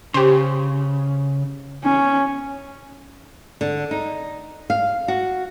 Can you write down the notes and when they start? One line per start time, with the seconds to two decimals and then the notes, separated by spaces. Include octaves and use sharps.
0.14 C#3 G4 C5
1.84 C#4
3.61 D3
3.91 D#4
4.70 F5
5.08 F#4